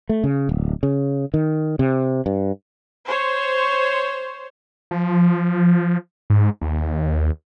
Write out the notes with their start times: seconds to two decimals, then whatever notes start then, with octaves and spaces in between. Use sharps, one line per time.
0.09 A3
0.24 C#3
0.49 D1
0.83 C#3
1.34 D#3
1.79 C3
2.26 G2
3.06 C5 C#5
4.91 F3
6.30 G#2
6.61 D#2